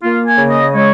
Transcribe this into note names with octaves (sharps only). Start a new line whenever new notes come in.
A#3 F4
G#5
C#3
D#5
G#3 C#5